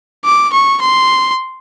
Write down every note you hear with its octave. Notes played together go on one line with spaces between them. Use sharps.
D6
C#6
C6